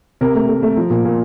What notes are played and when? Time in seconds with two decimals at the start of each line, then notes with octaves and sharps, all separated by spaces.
0.21 C3 A#4
0.35 A3
0.48 A3
0.63 A3
0.77 F3
0.90 A#2
1.05 A#2